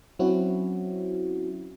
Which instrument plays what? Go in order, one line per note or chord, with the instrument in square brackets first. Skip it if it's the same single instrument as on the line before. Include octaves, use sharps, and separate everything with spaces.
[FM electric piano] F#3 C4 C#4 E4 F#4